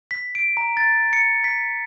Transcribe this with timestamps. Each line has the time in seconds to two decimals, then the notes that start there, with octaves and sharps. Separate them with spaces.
0.11 B6
0.35 D7
0.57 A#5
0.77 A6
1.13 C#7
1.44 B6